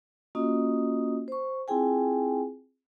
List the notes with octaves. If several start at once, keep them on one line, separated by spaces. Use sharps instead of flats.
A#3 C#4 F4 F#4 D#5 D#6
C5 C#6
C4 E4 F4 G#4 G5 G#5